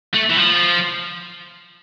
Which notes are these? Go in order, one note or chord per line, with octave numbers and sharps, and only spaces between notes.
A3
E3
F3